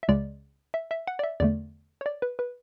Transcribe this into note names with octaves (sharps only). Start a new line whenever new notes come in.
E5
C#2 C#3 G#3 D5
E5
E5
F#5
D5
E5
E2 D3 A3 D5
C#5
D5
B4
B4